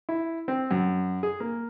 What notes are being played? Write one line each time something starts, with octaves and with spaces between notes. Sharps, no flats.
E4
C4
F#2
G#4
A#3